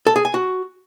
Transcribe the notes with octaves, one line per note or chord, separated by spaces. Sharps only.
A4
G#4
G#5
F#4